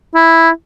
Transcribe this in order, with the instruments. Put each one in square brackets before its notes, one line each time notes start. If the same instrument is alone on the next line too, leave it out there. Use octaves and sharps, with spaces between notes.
[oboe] E4